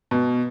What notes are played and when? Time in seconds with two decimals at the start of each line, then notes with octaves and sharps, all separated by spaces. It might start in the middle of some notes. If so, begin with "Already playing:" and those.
0.11 B2